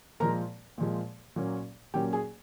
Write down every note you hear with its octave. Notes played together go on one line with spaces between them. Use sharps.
A#2 F3 G#3 A#4 A#5
A#2 F3 G#3
A#2 F#3 A#3 C#4
A#2 F#3 A#3 C#4 G4 G5
G#4 G#5